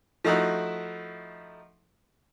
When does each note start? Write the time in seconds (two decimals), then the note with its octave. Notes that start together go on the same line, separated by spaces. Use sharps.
0.24 F3 A3 D#4 E4 F#4